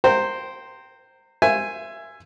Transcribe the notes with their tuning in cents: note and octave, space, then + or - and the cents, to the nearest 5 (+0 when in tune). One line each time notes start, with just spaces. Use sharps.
C5 +0 G5 -20 A#5 -25
C5 +0 E5 +20 G#5 -5